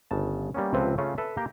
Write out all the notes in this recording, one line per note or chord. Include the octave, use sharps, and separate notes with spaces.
G1 C#3 A5
G3 A#3 B3 C#4
C#2 C3 F3 C4 A4 B4
C#3 A3 C#4 F4
A4 B4 E5
A#3 G4 A#4 G5